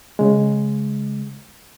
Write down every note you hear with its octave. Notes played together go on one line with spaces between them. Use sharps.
C#3 G#3